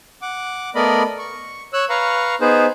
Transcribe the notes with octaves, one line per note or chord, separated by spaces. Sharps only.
F#5 D6
A3 B3 A#4 D5 D#5 B5
C#6
C#5 E6 F#6
B4 F5 A#5 C#6
B3 D#4 G#4 B4 C5